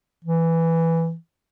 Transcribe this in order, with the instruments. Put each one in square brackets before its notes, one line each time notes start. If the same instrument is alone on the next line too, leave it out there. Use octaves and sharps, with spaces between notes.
[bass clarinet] E3